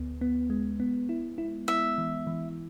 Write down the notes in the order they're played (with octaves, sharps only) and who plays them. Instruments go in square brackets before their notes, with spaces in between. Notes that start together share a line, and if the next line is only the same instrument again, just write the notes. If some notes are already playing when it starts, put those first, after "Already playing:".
Already playing: [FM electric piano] D2 B3
B3
G#3
B3
E4
E4
[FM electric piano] E4 [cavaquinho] E5
[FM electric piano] E3
E3